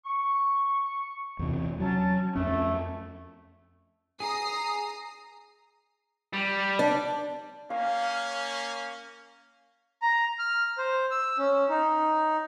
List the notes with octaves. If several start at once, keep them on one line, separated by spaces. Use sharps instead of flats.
C#6
E2 C3
F#3 C#4 A5
F2 A3 C#4
G#4 A#5 D#6 C7
G3
D4
A#3 C#4 F5
A#5
F6
C5
E6
C#4
D#4